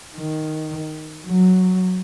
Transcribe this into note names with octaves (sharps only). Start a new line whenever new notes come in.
D#3
F#3